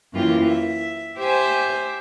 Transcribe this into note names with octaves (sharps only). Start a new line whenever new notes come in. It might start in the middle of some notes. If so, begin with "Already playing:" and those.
F#2 E3 A#3 F4 G4
E5
G4 C5 E5 G#5